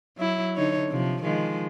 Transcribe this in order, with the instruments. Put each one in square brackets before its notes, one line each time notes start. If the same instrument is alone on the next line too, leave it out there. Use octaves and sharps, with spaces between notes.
[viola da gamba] F#3 E4
D3 D#4 C#5
C3 F3
D#3 F3 G#3